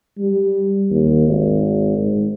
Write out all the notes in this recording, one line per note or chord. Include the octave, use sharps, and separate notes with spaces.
G3
D#2
G#1
G#2